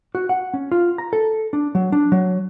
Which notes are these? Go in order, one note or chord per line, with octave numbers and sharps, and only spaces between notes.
F#4
F#5
C#4
F4
A#5
A4
D4
F#3
D4
F#3